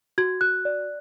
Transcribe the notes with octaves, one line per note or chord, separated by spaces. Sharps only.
F#4 G#6
F#4 F#6
D5